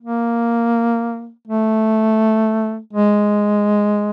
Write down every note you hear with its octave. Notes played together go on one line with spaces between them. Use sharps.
A#3
A3
G#3